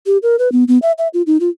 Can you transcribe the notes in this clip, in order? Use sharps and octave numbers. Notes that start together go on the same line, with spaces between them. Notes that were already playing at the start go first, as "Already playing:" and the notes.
G4
A#4
B4
B3
B3
E5
E5
F4
D#4
F4